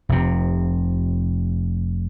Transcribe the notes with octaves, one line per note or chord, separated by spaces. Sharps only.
F1 C3